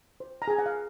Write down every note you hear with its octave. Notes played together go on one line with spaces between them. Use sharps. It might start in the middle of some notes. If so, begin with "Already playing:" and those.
C5
A#5
G#4 G#5
F#5
F5